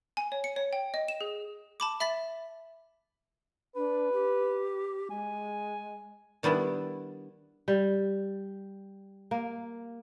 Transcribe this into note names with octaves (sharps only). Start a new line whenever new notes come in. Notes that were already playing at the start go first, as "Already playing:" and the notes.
G#5
C#5
C#7
C#5
G5
D#5
E7
G#4
A5 B5 D6
E5 B5 A6 B6
D4 B4
G4
G#3 G#5
D#3 G3 B3 D4 E4
G3
A#3